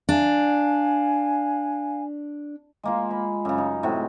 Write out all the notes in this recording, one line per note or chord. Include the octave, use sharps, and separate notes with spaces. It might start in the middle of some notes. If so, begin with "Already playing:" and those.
D4 F5 G#5
G#3 A#3 F4
B5
F#2 C#3
D#4
A2 C3 G#3 F#4